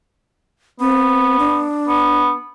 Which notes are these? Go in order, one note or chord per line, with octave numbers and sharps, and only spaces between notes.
B3 C4
D4
B3